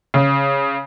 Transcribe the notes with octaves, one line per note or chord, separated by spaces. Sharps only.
C#3